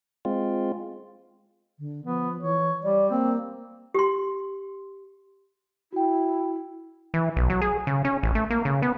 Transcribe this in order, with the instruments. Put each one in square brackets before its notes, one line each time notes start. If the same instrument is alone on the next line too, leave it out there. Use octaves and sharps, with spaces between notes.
[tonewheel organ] G#3 C4 F4
[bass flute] D3
[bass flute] F3 [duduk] B3
[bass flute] E3 [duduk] C#5
[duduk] G3 [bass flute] D5
[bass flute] A#3 [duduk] C4
[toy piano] G4 C6
[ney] E4 [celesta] F#4 G5
[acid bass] E3
B1
F#3
G#4
C#3
C#4
A1
A3
A#3
C#3
B3